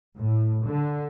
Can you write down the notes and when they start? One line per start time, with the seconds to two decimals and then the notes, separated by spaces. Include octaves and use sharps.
0.17 A2
0.63 D3